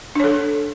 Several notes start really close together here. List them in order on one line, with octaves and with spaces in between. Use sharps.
D4 C#5 A4